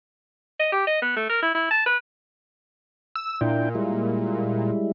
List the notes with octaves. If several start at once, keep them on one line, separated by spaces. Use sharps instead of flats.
D#5
G4
D#5
B3
A3
A#4
E4
E4
A5
B4
E6
A#2 D4 E4 G5
G3 G#3 E4